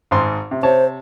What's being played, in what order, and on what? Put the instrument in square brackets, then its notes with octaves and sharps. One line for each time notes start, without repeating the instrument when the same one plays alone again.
[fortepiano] G#1 G#2 C6
C3
[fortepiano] C3 C#5 A5 [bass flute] C5